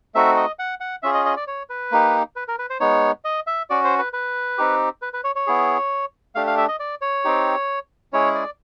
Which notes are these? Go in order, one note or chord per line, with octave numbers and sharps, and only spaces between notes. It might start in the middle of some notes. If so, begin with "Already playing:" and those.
A3 C4 D#4 F#4 E5
D#5
F#5
F#5
C#4 F4 G#4 E5
D#5
D#5
D5
C#5
B4
A#3 D#4 G4
B4
A#4
B4
C5
G#3 B3 D#4 C#5
D#5
E5
C#4 F#4 D5
C5
B4
B4
C4 D#4 G4
B4
B4
C#5
C#5
B3 E4 G#4
A3 D4 G4 F5
F5
E5
D#5
D5
C#5
C4 D#4 G4
G#3 C#4 E4 G#4 C#5
D5